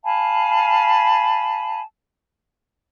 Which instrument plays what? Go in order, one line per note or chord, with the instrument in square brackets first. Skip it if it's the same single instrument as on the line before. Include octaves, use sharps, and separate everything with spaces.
[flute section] F5 G#5 A5 B5